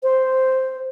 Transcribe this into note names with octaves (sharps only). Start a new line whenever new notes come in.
C5